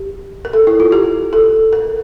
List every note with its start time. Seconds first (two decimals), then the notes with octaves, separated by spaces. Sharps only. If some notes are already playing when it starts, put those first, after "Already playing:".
Already playing: G4
0.45 A#4
0.53 A4
0.67 E4
0.80 F4
0.92 G4
1.33 A4
1.73 A#4